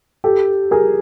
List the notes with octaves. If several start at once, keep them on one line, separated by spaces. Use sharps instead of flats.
G4 A4
G#4 A#4